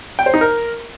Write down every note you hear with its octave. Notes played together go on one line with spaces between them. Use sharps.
G5
C5
D#4
A#4